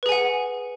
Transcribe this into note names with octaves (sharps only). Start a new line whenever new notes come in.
G#4 B4 F#5 G#5